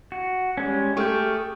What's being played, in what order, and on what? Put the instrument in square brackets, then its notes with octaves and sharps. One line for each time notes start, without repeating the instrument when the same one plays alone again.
[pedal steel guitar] F#4
G3 G#3 C#4
[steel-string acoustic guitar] A3 G4 G#4 [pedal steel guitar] C#6 F6 G6